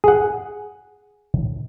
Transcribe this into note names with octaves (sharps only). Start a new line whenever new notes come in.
G#4 F#5